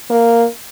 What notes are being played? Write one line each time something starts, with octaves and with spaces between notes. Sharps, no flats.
A#3